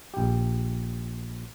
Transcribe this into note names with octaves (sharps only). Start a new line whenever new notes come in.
A#1 G4